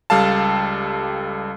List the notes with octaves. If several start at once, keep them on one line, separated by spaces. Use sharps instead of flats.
C#2 G3 A4 F5 A5